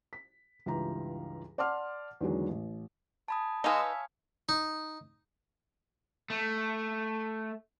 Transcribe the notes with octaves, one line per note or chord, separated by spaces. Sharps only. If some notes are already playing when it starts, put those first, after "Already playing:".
B6
C#2 G2 E3 F4 G4 A#5
D5 F#5 A5 C6 D6 F6
E2 D3 D#3 F#3 G#3
A1
G#5 A5 B5 D#6
G#3 D#4 B4 C#5 D#5 F5 G#5 E6
E5
D#4
A3